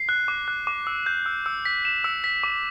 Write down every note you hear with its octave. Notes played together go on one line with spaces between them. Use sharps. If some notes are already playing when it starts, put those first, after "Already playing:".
Already playing: C7
F#6
D6
F#6
D6
E6
G6
E6
E6
B6
E7
E6
B6
D6